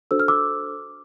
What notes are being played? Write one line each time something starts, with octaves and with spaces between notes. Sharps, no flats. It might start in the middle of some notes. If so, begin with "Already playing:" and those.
D4 F#4 A4 C5 E6
F6
D6 E6